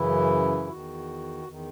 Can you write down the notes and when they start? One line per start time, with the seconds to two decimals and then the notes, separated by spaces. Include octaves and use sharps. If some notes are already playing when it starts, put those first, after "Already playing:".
Already playing: F#2 C#3 E3 E4
0.68 E2 D#3 F#4
1.45 E2 D#3